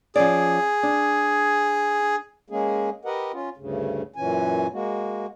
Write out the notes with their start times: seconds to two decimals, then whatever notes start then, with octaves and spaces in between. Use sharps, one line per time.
0.16 F3 C#4 G#4 D5
0.83 D4
2.50 G#3 A#3 C#4 G#4
3.05 G4 A#4 B4 D#5 F#5
3.33 C#4 F4
3.57 D2 G2 C#3
4.16 F#2 A#2 E3 C#4 G#5
4.72 G#3 A#3 F#4